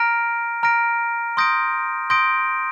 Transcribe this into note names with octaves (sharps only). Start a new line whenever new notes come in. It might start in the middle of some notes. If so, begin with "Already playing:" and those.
Already playing: A#5 F6 A#6 D7
A#5 F6 A#6 D7
C6 D#6 G6 A#6 D7
C6 D#6 G6 A#6 D7